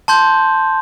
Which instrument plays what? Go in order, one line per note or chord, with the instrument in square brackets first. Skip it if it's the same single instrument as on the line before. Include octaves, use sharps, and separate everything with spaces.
[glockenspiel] A5 C6 G6